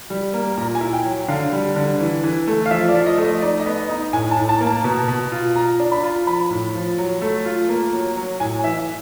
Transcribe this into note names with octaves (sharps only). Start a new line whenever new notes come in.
G3
A#3
A#2 A#5
G#5
E4
G5
F#3
D3 F5
G3
D3
E3
E3
A3
F5
F3 E5
D5
F3
D#5
A3
D#5
D#4 D5
D#5
B3
D#5
D#4
A2 G#5
A5
A2
A5
A#3
A5
B2
B2
F4
F4 A#5
D4
B5
F4
F3 B5
A2
F3
F#3
A3
F4
A#3
F#3
F#3
A2 G#5
E3 E5